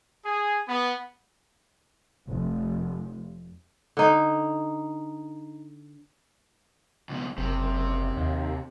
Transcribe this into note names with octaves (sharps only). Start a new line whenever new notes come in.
G#4
B3
F1
D3 D#4
C#2 B2
F#1 C3
D#2